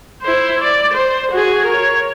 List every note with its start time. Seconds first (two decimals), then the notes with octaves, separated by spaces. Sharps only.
0.23 E4 C5
0.61 D5
0.93 C5
1.32 F#4 G#4
1.66 A#4 C#5